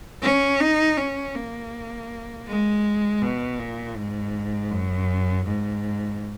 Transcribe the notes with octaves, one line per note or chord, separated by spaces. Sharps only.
C#4
D#4
C#4
A#3
G#3
B2
A#2
G#2
F#2
G#2